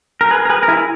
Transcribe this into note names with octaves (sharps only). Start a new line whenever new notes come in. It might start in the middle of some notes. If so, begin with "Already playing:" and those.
A#4
G#4 B4
A#4
G#4 B4
A#4
E4 G#4